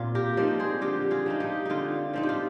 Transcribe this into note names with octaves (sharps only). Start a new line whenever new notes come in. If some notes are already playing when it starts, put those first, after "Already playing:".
Already playing: A#2 C4 F4
G4 A#4
F3 C4 D#4 A#4 D5
G#4 C5
D3 G4 A#4
F4 G#4
F3 C4 D#4
D#4 G4
D3 D#4 F4
F3 C4 D#4
G4
F4